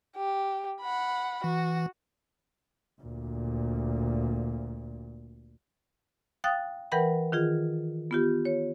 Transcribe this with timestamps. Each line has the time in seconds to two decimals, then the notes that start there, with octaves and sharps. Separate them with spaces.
0.16 G4
0.81 F#5 B5
1.44 E3 F#4
3.02 D2 A#2
6.44 F5 G5 D#6 F#6 A6
6.92 E3 A#4 B4 F#5 G5 B5
7.32 D#3 F4 G#4
8.11 B3 F4 G4
8.45 C#5